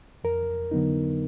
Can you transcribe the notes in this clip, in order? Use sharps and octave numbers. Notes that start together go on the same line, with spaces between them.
F2 A#4
D3 F#3 B3 D#4